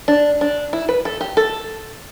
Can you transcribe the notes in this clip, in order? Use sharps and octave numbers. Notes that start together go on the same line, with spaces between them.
D4
D4
E4
B4
A4
G4
A4